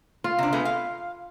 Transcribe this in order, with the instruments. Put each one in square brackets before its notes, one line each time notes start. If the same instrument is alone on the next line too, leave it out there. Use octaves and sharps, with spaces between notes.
[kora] F4
[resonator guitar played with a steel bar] C3 D4
G#3 A3 B3
F5